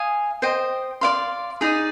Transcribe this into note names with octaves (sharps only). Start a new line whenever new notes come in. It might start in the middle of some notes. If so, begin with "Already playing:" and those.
Already playing: F5 G#5 D#6
C5 D#5 G5
D5 F5 C6
D#4 G#4 D5